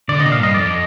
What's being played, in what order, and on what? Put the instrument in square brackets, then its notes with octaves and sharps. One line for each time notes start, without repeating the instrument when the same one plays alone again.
[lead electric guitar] D3 [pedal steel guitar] D5
[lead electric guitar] C3 [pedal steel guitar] D#5
[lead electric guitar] A#2
[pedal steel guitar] F5
[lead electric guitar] G2 [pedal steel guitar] D#5
[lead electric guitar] F2 [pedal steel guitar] D5
[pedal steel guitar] D#5